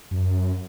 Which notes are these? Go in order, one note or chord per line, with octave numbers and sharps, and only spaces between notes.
F#2